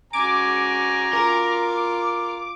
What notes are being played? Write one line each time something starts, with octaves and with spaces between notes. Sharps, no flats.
C#4 F#4 G#5 A#5 D6
F4 A#4